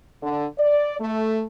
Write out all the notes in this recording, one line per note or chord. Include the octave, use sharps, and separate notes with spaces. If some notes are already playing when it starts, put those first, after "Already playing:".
D3
D5
A3